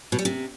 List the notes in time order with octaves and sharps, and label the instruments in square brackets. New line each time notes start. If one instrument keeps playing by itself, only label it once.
[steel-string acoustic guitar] B2
G3
C3